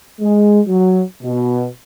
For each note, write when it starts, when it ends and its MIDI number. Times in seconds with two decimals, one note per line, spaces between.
0.20 0.60 56
0.67 1.01 54
1.22 1.66 47